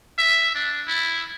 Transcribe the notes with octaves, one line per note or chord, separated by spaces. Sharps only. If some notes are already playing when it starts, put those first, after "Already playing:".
E5
D4
E4